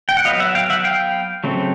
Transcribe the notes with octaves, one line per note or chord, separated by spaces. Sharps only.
G5
F#5
F#3 B3 D#5 F5
E5 F#5
F5 G5
E5 F#5
F5 G5
C#3 F#3 A3 C4